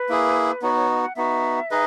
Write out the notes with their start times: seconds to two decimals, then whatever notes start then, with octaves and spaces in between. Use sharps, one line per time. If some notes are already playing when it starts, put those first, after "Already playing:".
Already playing: B4
0.09 A#3 E4 G#4
0.62 B3 D#4 F#4 C#5
0.75 C#5
0.89 D#5
1.03 F#5
1.16 B3 D#4 F#4 E5
1.71 D#4 G#4 B4 D#5